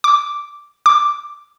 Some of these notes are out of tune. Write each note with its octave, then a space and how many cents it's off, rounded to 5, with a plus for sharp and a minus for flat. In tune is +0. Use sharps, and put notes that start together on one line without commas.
D6 -5
D6 +0